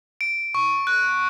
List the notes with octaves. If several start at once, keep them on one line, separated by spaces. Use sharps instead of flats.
D7
C#6
F#6